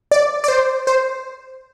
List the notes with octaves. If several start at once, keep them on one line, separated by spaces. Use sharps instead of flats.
D5
D5
C5
C5